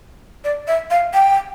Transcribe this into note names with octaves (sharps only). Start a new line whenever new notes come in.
D5
E5
F5
G5